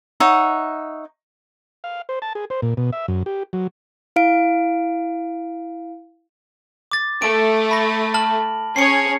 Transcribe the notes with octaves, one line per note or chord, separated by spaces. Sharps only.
D#4 C#5 E5 F#5
F5
C5
A5
G#4
C5
A#2
B2
E5
F#2
G4
F#3
E4 F5 D7
D6 A6
A3 D7
B5 A#6
A5 F6 F#7
C#4 G#4 C#5 C7 C#7